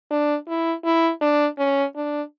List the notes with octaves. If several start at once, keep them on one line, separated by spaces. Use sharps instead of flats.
D4
E4
E4
D4
C#4
D4